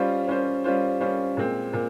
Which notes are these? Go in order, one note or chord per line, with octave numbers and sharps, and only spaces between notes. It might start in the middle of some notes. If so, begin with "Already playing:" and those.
Already playing: G3 C#4 F4 C5
G3 C#4 F4 C5
G3 C#4 F4 C5
G3 C#4 F4 C5
A#2 G#3 C4
A#2